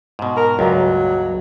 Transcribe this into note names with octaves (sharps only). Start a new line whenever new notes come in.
G#2 B2
A#4
C#2 G2 A#2 F#3